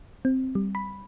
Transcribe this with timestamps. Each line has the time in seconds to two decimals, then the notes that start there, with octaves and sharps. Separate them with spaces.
0.25 C4
0.55 G3
0.75 B5